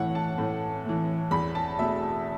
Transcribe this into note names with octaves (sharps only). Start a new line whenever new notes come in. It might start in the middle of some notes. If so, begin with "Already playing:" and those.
Already playing: A2 E3 A3 C#5 F#5
A5
A2
E3 A3
E2 B5
A5
B2 A3 E5